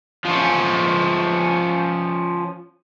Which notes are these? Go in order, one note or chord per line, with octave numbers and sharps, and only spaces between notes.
F3 C#4